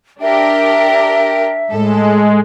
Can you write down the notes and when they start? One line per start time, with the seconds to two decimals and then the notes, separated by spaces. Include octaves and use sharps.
0.22 D4 G4 A#4 E5
1.71 A2 G#3 A4